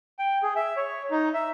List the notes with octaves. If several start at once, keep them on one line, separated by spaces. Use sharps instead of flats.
G5
G#4
E5
C#5
D#4
E5